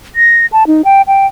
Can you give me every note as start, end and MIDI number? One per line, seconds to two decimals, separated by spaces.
0.16 0.46 94
0.52 0.67 81
0.67 0.82 63
0.85 1.02 79
1.07 1.26 79